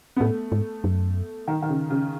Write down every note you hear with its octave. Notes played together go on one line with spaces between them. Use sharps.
B3
A2 A3
G#2
F#2
D#3
D#3
C#3
C#3